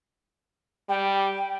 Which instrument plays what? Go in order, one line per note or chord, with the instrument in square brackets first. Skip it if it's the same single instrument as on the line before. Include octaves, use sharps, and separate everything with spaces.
[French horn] G3 [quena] G5